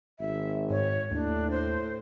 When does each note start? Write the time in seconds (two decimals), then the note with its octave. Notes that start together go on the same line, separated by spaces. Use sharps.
0.20 G#1 E5
0.70 G#2 C#5
1.11 D#2 A2 D4
1.50 C5